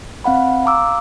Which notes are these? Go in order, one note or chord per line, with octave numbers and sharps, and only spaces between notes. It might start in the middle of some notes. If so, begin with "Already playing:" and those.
C4 F5 F#5 B5
F5 A#5 D6 E6